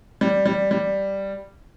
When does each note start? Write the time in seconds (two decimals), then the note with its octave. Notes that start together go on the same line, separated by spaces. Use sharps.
0.21 G3
0.46 G3
0.71 G3